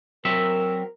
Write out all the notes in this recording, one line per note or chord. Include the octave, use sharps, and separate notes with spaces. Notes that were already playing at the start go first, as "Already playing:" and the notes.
F#3 C4 A#4 E5